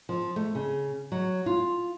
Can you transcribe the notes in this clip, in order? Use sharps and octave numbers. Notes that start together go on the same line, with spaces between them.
F3
A3
C#3
F#3
F4